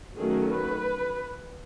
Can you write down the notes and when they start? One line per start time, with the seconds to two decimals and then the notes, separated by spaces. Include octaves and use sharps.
0.16 D#3 F#3 A3 C#4 G#4
0.51 B4